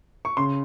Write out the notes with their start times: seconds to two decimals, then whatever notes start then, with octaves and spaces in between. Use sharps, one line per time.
0.25 C#6
0.37 C#3 C6